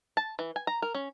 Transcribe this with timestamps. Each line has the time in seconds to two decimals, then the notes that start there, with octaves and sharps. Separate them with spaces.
0.17 A5
0.39 E3
0.56 G#5
0.67 A#5
0.82 A#4
0.94 C#4